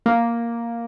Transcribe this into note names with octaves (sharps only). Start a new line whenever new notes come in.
A#3